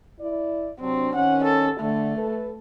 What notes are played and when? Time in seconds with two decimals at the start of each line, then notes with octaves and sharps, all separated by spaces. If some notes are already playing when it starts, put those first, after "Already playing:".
0.20 E4 D5
0.80 C3 F#3 C4 D4
1.15 D#3 C#4 F#5
1.44 A4
1.80 D3 A3
2.16 A4 B4